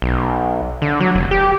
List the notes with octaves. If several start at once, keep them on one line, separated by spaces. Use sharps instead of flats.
B1
D3
F#3
F1
G4